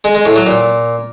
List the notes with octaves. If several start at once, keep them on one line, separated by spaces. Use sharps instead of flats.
G#3
G#3
A2
F#3
A#2